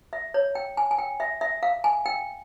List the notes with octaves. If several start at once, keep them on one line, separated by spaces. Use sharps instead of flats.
E5
C#5
G5
G#5
G#5
G5
E5
E5
F5
G#5
G5